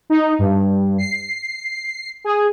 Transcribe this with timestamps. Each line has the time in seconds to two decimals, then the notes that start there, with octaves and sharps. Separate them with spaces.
0.10 D#4
0.39 G2
0.98 C7
2.24 G#4